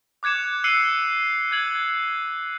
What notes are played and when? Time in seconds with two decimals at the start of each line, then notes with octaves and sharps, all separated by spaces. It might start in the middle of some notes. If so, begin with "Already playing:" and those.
0.23 D6 F#6 G#6 C#7 E7
0.64 E6 F#6 C7 C#7 D#7 F#7
1.51 F#6 G#6 F#7